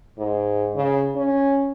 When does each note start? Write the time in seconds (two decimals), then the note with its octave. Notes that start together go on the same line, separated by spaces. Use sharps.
0.18 G#2
0.75 C#3
1.15 C#4